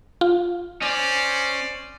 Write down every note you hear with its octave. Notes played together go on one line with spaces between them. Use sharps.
F4
C#4 C5 D5